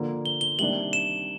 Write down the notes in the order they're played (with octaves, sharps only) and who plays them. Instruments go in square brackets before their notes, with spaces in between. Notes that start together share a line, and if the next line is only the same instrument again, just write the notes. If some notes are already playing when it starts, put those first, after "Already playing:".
Already playing: [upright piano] D3 F3 A#3
[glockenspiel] G7
G7
[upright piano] C3 D#3 G3 A#3 D4 [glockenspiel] F#7
[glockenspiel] E7